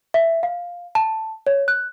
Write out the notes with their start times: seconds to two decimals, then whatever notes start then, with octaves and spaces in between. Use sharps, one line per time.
0.14 E5
0.43 F5
0.95 A5
1.47 C#5
1.68 F#6